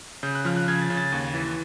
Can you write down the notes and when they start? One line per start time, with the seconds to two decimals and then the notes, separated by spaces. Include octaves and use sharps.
0.23 C#3 G6
0.35 F#6
0.45 F3 F6
0.57 F#6
0.68 C#3 G#6
0.82 A6
0.90 C#3
0.97 A6
1.12 D#2
1.34 E3